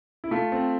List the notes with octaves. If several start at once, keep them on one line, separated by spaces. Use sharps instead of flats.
E4
A3 F4
C4